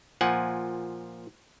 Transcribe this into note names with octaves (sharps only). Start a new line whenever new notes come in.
A#2 F3 F#5 G#5